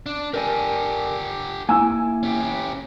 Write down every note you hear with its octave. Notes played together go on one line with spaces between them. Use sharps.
D4
G4 A4 A#4 D5 G#5
A#3 E4 G#5 E6
C#4 G4